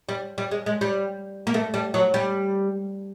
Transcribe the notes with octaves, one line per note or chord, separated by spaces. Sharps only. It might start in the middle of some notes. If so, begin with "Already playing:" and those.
G3
G3
G#3
G#3
G3
A#3
A3
G3
F#3
G3